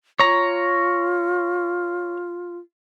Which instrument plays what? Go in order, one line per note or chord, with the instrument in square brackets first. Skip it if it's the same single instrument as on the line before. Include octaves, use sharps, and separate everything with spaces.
[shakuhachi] F4 [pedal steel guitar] C#5 A#5